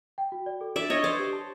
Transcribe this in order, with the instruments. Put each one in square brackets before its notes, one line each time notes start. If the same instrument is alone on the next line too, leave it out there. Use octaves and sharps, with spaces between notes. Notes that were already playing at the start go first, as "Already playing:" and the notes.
[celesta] G5
F#4
D5
A4
[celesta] D4 [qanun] D5 E5
[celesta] D4 [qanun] C#5 D#5
[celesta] B4 [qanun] C5 D5
[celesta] G4
A5